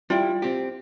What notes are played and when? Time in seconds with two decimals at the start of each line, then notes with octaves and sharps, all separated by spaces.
0.10 G3 E4 F4 G5
0.42 C4 G4